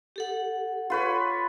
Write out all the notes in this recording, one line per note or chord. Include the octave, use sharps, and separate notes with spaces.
G4 A4 F#5
F4 B4 C#5